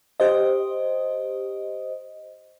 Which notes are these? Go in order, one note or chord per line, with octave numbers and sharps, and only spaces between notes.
G4 C5 D#5